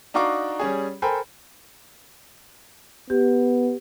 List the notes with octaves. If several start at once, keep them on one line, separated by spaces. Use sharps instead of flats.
D4 D#4 F#4 F5 C#6 D6
G3 C#4 G#4
A4 A#4 C5 G5 G#5 B5
B3 G4